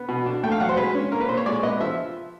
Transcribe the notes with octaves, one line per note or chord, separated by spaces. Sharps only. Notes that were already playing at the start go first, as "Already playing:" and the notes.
Already playing: B3
B2
D4
A3 G5
F5
F#3 F#5
C5
G#3 B4
C#4
A#3 A#4
B4
A#2 C5
C#5
G#3 D5
B3 D#5
F3 E5